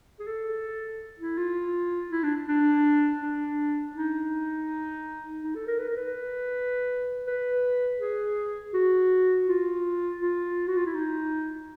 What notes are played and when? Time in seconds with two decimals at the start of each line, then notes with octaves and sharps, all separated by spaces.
0.20 G#4
0.27 A4
1.20 E4
1.38 F4
2.11 E4
2.23 D4
2.48 D4
3.22 D4
3.96 D#4
5.43 D#4
5.55 A4
5.67 A#4
5.79 B4
5.88 A#4
5.97 B4
7.27 B4
8.01 G#4
8.74 F#4
9.48 F4
10.21 F4
10.68 F#4
10.77 F4
10.86 E4
10.95 D#4